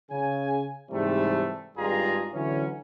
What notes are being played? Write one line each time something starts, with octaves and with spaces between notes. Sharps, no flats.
C#3 G#5
G#2 C3 E3 G3 A3
G#1 G2 G#3 F4 G#4 A#5
D3 E3 F#3 C#4